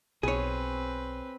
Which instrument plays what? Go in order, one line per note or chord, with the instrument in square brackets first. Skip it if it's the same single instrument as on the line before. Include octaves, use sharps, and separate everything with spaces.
[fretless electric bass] B1 [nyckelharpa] C4 B4 [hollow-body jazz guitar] G#4 C#5